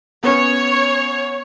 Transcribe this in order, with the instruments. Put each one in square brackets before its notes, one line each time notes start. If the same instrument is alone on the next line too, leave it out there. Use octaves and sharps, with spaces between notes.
[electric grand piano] B3 C#4 [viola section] C#5